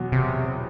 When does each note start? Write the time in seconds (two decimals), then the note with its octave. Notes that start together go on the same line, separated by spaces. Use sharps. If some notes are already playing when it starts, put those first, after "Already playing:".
Already playing: E2 B2 F#3 B3
0.12 C3